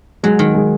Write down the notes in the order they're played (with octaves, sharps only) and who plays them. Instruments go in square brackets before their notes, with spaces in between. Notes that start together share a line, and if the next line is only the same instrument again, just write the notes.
[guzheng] F#3 [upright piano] G#3
[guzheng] D#3
[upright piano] G#3